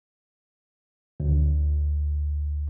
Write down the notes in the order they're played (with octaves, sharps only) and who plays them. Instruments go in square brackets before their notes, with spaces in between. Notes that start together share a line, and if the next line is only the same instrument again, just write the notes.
[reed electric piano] D2